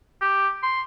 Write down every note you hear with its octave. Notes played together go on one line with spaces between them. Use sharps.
G4
C6